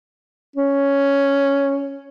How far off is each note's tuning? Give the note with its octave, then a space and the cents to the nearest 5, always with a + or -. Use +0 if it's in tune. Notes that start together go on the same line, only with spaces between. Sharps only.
C#4 +5